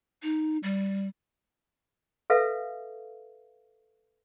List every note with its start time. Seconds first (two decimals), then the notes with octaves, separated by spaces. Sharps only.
0.23 D#4
0.63 G3
2.30 A4 B4 E5 F5